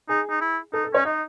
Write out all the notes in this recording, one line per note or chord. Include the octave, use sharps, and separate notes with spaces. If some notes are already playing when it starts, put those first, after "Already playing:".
D#4 G#4
D#4
E4
D#4 A4
A4
C#4 C#5
D#4 D#5